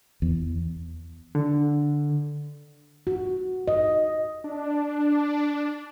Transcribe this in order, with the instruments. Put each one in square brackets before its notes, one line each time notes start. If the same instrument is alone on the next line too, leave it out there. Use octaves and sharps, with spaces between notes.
[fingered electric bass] E2
[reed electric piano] D3
[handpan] F#4
D#5
[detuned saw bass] D4